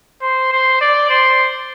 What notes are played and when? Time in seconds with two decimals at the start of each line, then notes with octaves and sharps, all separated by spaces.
0.22 C5
0.52 C5
0.81 D5
1.10 C5